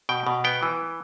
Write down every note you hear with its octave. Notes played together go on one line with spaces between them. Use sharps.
B2 G5
B2
B3 G5
E3